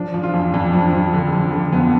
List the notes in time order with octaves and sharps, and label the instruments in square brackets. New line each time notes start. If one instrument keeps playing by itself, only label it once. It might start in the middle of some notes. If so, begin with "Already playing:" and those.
Already playing: [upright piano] F3 D4
F3
F4
F2
F2 D4
F3
F3
D3
F3
D3
F2 B3